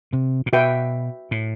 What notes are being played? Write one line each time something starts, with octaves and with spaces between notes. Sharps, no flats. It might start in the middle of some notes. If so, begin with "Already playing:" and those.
C3
A#2
B2 F#4 B4 E5 G5
A2